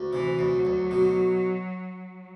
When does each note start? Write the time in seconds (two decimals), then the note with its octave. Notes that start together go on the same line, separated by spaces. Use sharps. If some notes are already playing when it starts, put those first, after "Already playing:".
Already playing: D2
0.13 C3 E3
0.39 D2
0.53 F#3
0.65 D2
0.91 B2